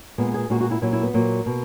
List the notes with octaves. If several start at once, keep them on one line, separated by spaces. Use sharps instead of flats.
A#2 G#3 B3
G#4
A#2 G#3 F#4
F#4
E4
A#2 F#3 E4
E4
B3
A#2 F#3 A#3
B2